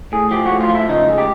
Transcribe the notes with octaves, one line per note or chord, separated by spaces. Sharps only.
A2 G#4
F3 G4
A2 F#4
F4
F3
E4
C#2 D#4
G#3
G4